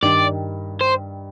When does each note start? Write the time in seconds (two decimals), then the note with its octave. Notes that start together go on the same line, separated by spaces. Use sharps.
0.03 G2 D#3 G3 D5
0.81 C5